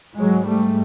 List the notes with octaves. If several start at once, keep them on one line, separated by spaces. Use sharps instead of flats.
G#2 F#3 G#3
G3 A3